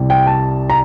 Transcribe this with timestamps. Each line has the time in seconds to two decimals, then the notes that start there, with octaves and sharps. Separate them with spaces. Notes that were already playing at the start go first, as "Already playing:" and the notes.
Already playing: C2 C3 G3
0.10 G5
0.27 A5
0.70 A#5